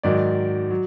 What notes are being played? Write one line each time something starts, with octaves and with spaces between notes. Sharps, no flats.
G#2 D#3 F#3 D5
F#3